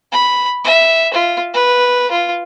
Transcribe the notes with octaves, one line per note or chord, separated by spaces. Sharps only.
B5
E5
F4
B4
F4